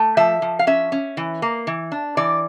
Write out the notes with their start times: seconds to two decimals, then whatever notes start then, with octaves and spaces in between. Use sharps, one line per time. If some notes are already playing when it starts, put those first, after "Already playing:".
Already playing: A3
0.17 F3 E5
0.42 F3
0.59 F5
0.67 C#4 E5
0.92 C#4
1.17 E3
1.42 A#3
1.67 E3
1.92 D4
2.17 E3 D5